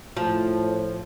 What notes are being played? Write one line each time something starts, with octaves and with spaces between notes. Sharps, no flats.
A2 F3